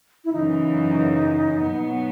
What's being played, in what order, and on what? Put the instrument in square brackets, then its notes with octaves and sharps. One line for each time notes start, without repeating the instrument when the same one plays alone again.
[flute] E4
[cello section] F#2 C#3 E3 [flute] D#4
[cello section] B2 F#3 B3